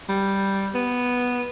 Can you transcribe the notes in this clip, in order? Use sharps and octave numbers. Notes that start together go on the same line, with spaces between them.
G3
B3